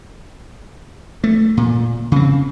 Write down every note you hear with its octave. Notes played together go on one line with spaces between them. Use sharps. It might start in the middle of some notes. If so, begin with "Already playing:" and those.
A3
A#2
C#3 C4